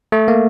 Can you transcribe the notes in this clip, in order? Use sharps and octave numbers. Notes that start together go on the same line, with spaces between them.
A3
A#3